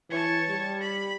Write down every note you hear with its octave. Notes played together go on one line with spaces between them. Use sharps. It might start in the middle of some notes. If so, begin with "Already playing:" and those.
E3 C#5 A5
G3
B5